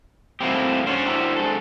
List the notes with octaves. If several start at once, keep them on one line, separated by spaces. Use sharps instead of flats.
A3 A#3 C4 E4 F#4 G4
C#4 D4 F#4 C5 C#5
E4 G4 A#4
G#3 A4